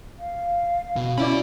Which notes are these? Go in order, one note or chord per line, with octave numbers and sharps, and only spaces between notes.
F5
B2
C#4 E4 F#4 D5 B5